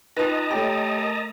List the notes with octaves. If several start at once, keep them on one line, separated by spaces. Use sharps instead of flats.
D#4 F4 B4 D#5 G5 A5 A#5 F7
A3 G4 A4 C#5 B5
A#4